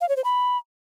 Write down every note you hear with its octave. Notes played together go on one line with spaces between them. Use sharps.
F5
C#5
C5
B5